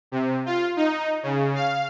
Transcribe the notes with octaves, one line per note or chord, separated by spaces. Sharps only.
C3
F4
D#4
C#3
F5